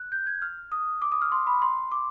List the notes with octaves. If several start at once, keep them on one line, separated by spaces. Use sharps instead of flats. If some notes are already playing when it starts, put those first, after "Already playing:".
Already playing: F#6
G6
G#6
F6
D#6
D6
D#6
F6
C6
B5
C6
D6